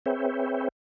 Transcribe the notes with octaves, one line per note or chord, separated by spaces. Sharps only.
C4 G#4 B4 C#5 E5 G5